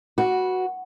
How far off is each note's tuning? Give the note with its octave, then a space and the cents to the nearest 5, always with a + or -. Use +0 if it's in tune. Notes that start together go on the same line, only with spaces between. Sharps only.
F#4 +0 B4 -15